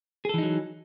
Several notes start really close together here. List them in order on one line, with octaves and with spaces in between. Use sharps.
G#4 A4 E3 D#4 F#3